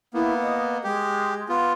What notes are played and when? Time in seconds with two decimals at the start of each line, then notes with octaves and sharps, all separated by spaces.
0.14 A#3 B3 E4
0.41 D#5
0.84 G#3 G4
1.49 B3 F4